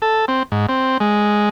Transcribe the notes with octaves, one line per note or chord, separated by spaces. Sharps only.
A4
C4
G#2
C4
G#3